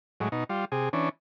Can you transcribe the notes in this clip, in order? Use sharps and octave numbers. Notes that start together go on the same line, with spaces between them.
A2 F#3 G#3
B2 D#4
G3 F4
C3 G#4
E3 C#4 D4